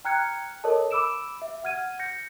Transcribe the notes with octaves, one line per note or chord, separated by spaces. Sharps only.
G5 A#5 F6 F#6 G#6 C#7
A4 A#4 C#5 D#5 A5
B5 D6 E6 D7 E7
E5
F#5 F6 G#6 D#7
G6 A#6 C#7